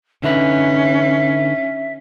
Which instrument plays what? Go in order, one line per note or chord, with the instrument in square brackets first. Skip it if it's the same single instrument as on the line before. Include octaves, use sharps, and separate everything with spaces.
[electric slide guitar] D3 D#4 B4 [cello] C#4 [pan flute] E5